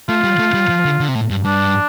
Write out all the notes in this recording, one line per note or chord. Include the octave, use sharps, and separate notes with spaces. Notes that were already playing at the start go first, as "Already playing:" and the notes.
A3 F4
G3
A3
G3
F3
D3
D3
C3
A2
G2
G2 D4